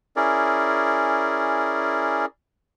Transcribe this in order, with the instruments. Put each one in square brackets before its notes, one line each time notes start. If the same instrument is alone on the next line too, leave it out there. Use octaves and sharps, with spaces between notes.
[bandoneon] C#4 E4 G#4 A#4 D5